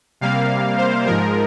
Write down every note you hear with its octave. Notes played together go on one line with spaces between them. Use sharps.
C3 G3 A#3 F5
C5
G#2 F3 G#3 A#4